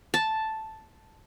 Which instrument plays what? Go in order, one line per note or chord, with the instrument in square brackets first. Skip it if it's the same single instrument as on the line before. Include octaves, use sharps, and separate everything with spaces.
[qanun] A5